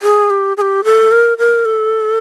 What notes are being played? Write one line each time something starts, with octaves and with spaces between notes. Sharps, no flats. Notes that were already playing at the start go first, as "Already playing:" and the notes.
G#4
G4
G#4
G4
A4
A#4
A#4
A4